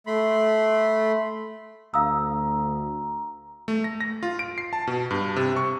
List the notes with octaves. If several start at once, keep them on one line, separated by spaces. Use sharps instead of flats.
A3 B5 C6
D2 F5 A#5 D#6 E6
A3
A#6
A#6
F4
D7
C7
A5
B2
G2
C3
C#6